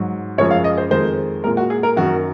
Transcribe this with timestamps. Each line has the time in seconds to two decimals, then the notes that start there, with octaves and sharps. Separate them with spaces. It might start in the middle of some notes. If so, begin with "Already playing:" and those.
Already playing: G#2 F#3
0.38 F#2 C#3 F3 G#3 C#5
0.51 F5
0.64 D#5
0.78 C5
0.91 F2 D#3 G#3 C5
1.44 A#2 G#3 A#4
1.57 F#4
1.70 G#4
1.83 A#4
1.96 F#2 D#3 F#3 F#4